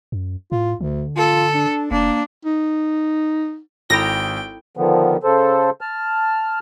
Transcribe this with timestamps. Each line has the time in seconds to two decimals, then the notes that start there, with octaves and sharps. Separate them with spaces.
0.12 F#2
0.52 A2 F4
0.81 D2 D3
1.17 F4 A4
1.54 D4
1.91 F1 A#3 D4
2.45 D#4
3.90 G#1 E4 A4 G5 B5 A#6
4.77 D3 D#3 F3 B3
5.23 C#3 A4 C5
5.81 A5 F6